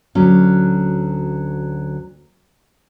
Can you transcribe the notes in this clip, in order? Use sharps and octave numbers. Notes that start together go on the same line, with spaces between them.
D2 F#3 C#4